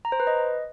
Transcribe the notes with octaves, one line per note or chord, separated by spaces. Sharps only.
A#5
C5
B4
D#5